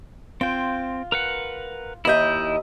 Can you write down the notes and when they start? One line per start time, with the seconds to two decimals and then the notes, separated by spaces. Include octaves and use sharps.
0.41 C4 F4 G5
1.12 A#4 B4 F#5
2.05 D#2 E4 D#5 E5 G6